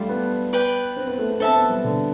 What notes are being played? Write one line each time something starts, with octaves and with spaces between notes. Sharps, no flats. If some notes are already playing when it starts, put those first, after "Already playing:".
Already playing: G3 A3 F4 A4
B3
B4 D5 G5
C4
B3
A3
B3
C4 A4 E5 A5
B3
G3
D3